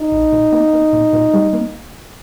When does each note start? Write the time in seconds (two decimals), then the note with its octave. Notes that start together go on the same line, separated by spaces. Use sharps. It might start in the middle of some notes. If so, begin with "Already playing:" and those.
Already playing: D#4
0.12 A#1
0.32 A#2
0.52 A#3
0.73 A#3
0.93 A#2
1.13 A#2
1.34 G3
1.53 A#3